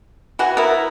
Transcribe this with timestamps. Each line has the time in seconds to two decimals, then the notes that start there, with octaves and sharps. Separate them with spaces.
0.39 E3 F#4 F#5 G#5
0.57 B3 E4 A#4